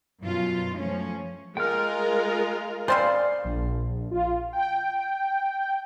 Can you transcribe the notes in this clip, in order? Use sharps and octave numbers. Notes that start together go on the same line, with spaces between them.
F#2 B2 F#3 F4
F3 A3 C#4
G#3 F4 A#4 G5 F6
C#3 C4 G#4 C5 D5 F5
A#1
F4
G5